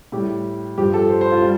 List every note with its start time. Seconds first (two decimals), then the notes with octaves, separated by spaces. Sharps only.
0.12 A2 G3 G4
0.77 G2 F3 G4
0.94 A4
1.09 C5
1.21 C5
1.32 F4
1.42 G3